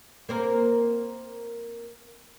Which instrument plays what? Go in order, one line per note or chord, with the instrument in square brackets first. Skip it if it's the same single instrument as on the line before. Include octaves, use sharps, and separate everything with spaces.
[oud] A#3 C4 A#4